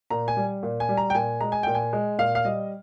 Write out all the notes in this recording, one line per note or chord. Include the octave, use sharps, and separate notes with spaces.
A#2 A#5
G#5
G3
A#2
G#5
G3
A#5
G5
A#2 G#5
G#3 A#5
G#5
A#2 G5
G#5
G#3
A#2 F5
F5
G3 D#5